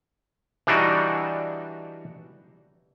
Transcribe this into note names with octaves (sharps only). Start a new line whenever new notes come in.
E3 G3 D4 D#4 F#4